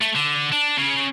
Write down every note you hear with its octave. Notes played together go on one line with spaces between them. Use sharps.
A3
D3
D4
C#3